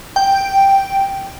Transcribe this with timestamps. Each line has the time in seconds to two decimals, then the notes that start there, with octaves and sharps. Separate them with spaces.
0.16 G5